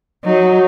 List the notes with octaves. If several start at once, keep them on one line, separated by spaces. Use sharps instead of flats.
F#3 D#4